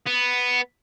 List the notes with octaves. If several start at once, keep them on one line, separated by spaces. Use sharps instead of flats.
B3